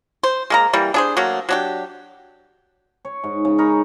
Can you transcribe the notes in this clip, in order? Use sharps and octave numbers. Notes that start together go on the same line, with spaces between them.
C5
G#3 A#3 A#5
E3 G3 A#3
D4 G#4 C5
F#3 A3 A#3
F#3 D4 G4
C#5
G#2
C#3
D#4 A#4 B5 C#6